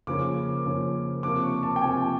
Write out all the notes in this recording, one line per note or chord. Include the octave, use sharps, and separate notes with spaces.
C#3 F3 A#3 C#4 D6
C#3 F3 A#3 C#4
C3 F3 A#3 D4 D6
C#6
A5
G5
C3 F3 A#3 D4 G#5